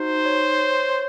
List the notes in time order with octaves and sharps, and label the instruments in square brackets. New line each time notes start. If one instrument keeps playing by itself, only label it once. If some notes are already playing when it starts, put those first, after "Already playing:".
Already playing: [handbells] D#4 F#4 [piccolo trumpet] C5
[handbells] C#5
C#5
C#5